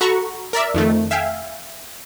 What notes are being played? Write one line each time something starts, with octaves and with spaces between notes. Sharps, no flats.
F#4 A4 A#5 B5 C#6
A#4 D5 E5
F2 D#3 A3
E5 F5 G5 G#5